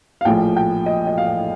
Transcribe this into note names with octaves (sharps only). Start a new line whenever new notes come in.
F5
A#1 A2 F3 G5
G5
D#5
D#5
F5